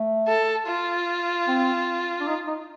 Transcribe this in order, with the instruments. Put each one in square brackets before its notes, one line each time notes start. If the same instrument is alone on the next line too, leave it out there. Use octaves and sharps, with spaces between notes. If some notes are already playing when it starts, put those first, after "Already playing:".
Already playing: [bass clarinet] A3
[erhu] A4
F4
[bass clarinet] C4
D4
D#4
D#4